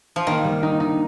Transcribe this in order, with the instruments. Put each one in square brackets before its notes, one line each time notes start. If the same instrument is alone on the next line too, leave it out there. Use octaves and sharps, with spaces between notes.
[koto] F3
[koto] D#3 [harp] A#3
[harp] G3
D#4
D#4